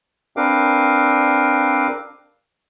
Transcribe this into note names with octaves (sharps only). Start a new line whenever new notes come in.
C4 D4 A#4 B4 F5 D6